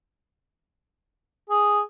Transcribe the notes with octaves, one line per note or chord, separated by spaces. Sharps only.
G#4